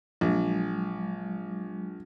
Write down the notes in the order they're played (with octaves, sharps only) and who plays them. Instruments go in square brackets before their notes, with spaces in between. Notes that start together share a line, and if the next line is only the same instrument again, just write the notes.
[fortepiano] A#1 [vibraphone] F#3 G#3